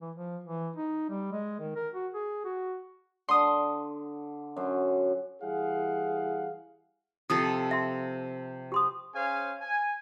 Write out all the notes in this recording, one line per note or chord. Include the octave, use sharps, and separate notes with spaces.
E3
F3
E3
D#4
G3
G#3
D#3
A#4
F#4
G#4
F#4
D3 C6 D#6
F#2 C5
E3 G3 E4 G#4 F5 F#5
C3 F3 A4 D#6
E5 C6
G4 C6 D#6
C#4 G#4 C5 F5 G#5
G#5